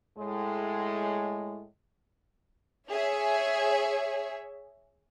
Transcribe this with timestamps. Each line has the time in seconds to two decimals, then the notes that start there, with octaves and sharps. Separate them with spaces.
0.17 A2 G#3
2.91 G#4 C#5 E5